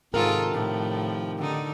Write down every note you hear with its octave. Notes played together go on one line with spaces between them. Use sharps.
G#2 C3 D#3 F4 G4 A4 A#4
A2 F3
D3 D#4